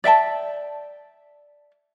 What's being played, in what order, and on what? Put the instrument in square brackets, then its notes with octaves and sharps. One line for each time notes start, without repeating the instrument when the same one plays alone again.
[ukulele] D5 E5 G5 A5